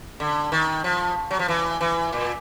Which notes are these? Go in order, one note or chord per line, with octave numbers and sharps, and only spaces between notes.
D3
D#3
F3
F#3
F3
E3
E3
A#2